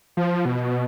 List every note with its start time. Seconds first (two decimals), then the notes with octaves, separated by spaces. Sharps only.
0.17 F3
0.45 B2